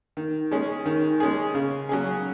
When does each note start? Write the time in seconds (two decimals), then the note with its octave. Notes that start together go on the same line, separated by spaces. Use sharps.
0.17 D#3
0.51 G#3 C#4 G#4
0.86 D#3
1.20 G#3 C#4 G#4
1.54 C#3
1.89 F#3 C#4 G#4